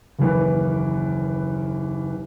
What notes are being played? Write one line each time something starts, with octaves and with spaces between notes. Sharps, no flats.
F#1 D#2 E3 B4